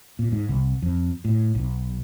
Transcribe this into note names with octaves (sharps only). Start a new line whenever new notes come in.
A#2
G#2
C2
F2
A2
B1